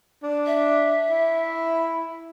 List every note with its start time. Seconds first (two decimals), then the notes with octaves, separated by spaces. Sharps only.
0.23 D4
0.47 E5
1.10 E4